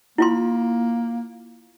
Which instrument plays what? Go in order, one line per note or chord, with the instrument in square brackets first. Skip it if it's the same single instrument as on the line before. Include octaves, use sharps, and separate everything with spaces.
[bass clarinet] A#3 [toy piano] E4 F4 C6